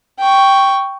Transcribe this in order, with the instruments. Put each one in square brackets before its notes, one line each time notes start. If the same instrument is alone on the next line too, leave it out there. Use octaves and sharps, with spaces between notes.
[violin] G5 C#6